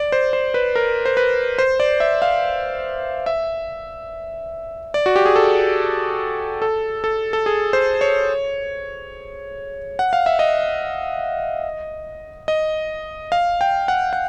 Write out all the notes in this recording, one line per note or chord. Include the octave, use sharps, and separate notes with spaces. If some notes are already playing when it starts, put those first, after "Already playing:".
Already playing: D5
C5
C5
B4
A#4
C5
B4
C5
D5
E5
F5
E5
D5
F#4
G4
G#4
A4
A4
A4
A4
G#4
C5
C#5
F#5
F5
E5
D#5
D#5
F5
G5
F#5
F#5